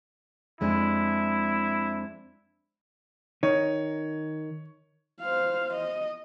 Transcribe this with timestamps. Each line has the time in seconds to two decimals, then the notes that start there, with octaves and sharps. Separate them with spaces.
0.61 F2 G#3 D4 E4
3.43 D#3 D#4 C#5
5.22 C5 F5
5.74 D#5